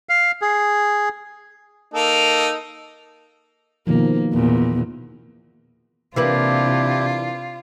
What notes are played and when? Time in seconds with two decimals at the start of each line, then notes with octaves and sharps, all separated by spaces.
0.09 F5
0.42 G#4
1.94 A#3 D#4 A4
3.87 B2 D#3 F3 A#3
4.33 E2 A#2
6.16 C3 E3 A#3 D4 E4 F4 G4 B4